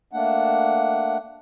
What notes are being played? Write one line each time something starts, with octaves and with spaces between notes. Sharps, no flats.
A3 A#3 D4 F#5